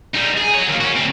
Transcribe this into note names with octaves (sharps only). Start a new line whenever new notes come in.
G3 D#4
G#4
F#4 C#5
D#2 A#3
C#4 F#4
D2 C4